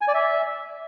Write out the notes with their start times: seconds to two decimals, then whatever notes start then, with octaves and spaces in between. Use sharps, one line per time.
0.01 G#5
0.08 D5
0.14 E5